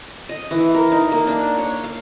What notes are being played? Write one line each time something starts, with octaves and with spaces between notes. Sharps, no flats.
D#5
E3
A#4
D#4
A#3
D4
C#5
F5